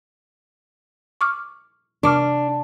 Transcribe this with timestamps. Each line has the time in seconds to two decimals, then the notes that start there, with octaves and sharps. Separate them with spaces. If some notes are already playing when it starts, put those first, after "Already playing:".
1.21 C#6 D6 F6
2.03 C3 D4 D6 F6